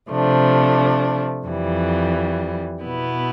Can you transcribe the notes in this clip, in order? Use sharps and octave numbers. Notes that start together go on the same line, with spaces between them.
C3 F3 A3 D4
F2 E3 G3
B2 B3 E4